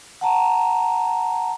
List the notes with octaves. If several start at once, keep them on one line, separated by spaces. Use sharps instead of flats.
F#5 A5 A#5